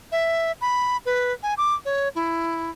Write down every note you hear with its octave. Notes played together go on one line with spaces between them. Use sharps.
E5
B5
B4
G#5
D6
C#5
E4